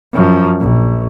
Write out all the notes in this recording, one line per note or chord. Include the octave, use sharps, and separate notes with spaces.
F#2 F3
A#1